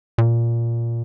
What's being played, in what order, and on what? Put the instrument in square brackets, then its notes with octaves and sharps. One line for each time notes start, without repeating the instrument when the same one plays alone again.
[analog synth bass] A#2